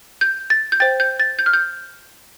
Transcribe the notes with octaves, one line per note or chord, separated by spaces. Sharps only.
G6
A6
G6
C5 G5 A6
G6
A6
G6
F6
G6